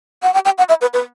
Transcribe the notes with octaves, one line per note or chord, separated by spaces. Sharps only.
F#5
G5
G5
F#5
E5
B4
B4